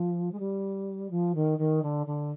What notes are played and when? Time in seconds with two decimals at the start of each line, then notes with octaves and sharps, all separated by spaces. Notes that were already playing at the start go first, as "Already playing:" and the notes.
Already playing: F3
0.31 G#3
0.39 G3
1.10 F3
1.34 D#3
1.58 D#3
1.82 D3
2.06 D3